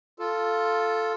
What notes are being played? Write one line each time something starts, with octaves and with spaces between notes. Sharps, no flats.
F4 A4